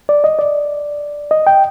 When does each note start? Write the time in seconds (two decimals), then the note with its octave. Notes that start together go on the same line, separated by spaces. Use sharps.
0.09 D5
0.24 D#5
0.39 D5
1.31 D#5
1.47 G5